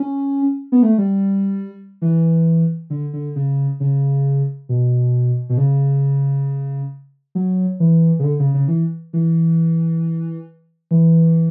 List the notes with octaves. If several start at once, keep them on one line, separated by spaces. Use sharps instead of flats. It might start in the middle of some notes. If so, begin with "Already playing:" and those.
Already playing: C#4
B3
A3
G3
E3
D3
D3
C#3
C#3
B2
B2
C#3
F#3
E3
C#3
D3
C#3
C#3
E3
E3
E3